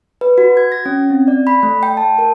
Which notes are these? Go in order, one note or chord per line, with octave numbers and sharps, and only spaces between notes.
B4
F#4
G#6
A#6
C#4
C4
D5
B5
A3
G5
A5
A#4